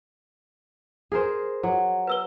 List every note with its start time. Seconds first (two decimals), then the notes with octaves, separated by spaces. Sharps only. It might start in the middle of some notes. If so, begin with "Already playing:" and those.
1.12 G#4 A#4 C5
1.63 F#3
2.07 B4 E6 G7